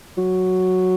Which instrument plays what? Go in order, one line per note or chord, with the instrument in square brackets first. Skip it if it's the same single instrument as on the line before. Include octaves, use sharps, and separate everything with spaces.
[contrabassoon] F#3